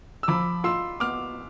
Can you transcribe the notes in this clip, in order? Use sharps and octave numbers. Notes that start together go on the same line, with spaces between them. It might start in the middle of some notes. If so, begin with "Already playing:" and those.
E6
F3 B5 D6
F4 C6 E6
B3 D6 F6